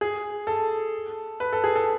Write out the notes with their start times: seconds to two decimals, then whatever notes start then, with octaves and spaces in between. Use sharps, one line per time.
0.01 G#4
0.47 A4
1.40 B4
1.53 A4
1.64 G#4
1.76 A4